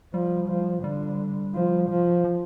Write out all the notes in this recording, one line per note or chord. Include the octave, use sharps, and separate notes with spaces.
F3 G3
F3
D3 G3
F3
F3
F3